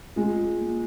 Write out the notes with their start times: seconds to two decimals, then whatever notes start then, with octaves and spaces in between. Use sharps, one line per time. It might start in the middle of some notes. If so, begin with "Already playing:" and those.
0.16 G#3 F4
0.61 A#3